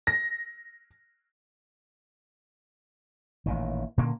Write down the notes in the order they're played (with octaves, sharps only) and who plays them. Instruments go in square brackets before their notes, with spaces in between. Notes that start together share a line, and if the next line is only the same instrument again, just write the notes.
[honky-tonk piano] A#6
[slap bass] A1 A#2 D#3
A#2 D3 A#3 C#4